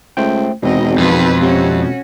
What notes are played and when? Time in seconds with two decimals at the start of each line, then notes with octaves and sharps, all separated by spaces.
0.17 C#2 A3 C5 G5
0.63 G#1 E2 B2 G#3 C4 D#5
0.98 F2 B4
1.41 C3 C#4 F#4